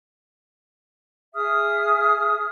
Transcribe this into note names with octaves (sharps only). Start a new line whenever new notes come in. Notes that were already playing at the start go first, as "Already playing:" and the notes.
G#4 E5 D#6 F6